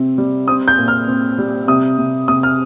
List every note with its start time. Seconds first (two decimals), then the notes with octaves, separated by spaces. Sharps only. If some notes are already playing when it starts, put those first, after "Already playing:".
Already playing: C3 C4
0.18 G3
0.48 C4 D#6
0.68 G6
0.78 A#2
0.88 F6
1.08 C4
1.38 G3
1.68 C3 D#6
1.98 C3
2.28 C3 D#6
2.43 F6